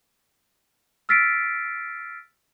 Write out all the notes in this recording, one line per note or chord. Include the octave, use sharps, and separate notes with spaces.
E6 F6 A6 B6 C7 D7